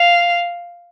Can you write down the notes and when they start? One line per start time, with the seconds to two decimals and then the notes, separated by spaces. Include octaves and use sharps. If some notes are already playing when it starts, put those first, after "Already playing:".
Already playing: F5